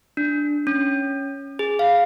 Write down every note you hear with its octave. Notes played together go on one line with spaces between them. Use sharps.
D4
C#4
G#4
F5